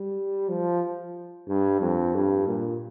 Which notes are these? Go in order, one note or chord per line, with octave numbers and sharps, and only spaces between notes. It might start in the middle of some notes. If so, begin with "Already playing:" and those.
Already playing: G3
F3
G2
F2
G2
A#2